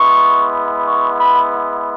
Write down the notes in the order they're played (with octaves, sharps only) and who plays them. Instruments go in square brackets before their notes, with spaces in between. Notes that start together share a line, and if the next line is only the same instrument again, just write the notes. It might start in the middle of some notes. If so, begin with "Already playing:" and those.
Already playing: [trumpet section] G#3 B3 E4 C#6
C#6
B5